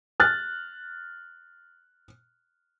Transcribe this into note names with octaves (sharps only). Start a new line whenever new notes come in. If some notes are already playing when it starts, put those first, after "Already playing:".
F6 F#6 A6